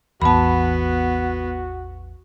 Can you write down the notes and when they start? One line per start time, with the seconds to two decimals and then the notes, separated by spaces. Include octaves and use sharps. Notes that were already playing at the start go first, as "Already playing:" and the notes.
0.22 A1 E2 B3 F#4 A5 B5